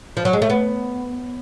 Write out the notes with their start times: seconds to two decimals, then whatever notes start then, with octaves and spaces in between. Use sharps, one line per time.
0.17 F3
0.25 F#3
0.33 G#3
0.42 A3
0.50 B3